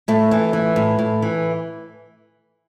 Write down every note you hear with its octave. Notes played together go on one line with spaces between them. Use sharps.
A2 A3
E3
E3
A2
A2
E3